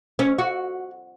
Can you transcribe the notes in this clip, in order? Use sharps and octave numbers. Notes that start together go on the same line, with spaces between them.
C#4
F#4